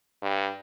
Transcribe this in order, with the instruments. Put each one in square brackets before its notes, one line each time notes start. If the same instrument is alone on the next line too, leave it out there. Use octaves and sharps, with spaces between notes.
[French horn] G2